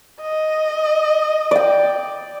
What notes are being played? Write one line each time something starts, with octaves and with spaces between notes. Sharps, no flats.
D#5
D5 G5